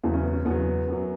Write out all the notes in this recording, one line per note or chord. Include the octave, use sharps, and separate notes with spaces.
E2 C#3 F#3 E4
C#4
B3
C#4
E2 C#3 F#3 B3
F#2 F#3